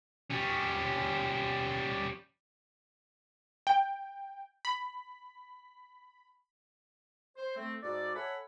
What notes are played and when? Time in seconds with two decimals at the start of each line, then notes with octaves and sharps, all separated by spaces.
0.31 G3 C#4
3.67 G5
4.65 B5
7.36 C5
7.56 A3 C4
7.83 G#2 F#4 A4 D5
8.16 A4 C#5 E5 F#5 G#5 B5